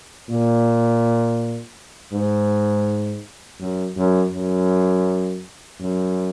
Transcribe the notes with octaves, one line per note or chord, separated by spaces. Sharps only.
A#2
G#2
F#2
F#2
F#2
F#2